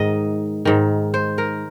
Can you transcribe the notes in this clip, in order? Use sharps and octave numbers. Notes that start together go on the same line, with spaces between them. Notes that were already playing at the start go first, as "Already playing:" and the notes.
Already playing: G#2 D#3 D#5
G#2 D#3
C5
A#4